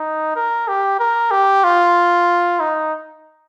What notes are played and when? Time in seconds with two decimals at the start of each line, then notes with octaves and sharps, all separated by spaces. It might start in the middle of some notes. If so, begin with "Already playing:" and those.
Already playing: D#4
0.36 A#4
0.68 G4
1.00 A#4
1.31 G4
1.64 F4
2.60 D#4